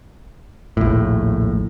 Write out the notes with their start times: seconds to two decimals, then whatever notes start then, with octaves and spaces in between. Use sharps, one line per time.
0.77 A#1 D#2 A2